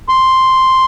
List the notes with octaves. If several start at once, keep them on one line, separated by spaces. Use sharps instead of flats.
C6